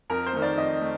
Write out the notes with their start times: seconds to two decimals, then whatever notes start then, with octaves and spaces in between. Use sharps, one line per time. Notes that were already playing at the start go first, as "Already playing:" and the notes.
0.10 F2 A#4
0.26 C5
0.33 D#3 A3
0.42 D5
0.57 F2 D#5
0.81 A3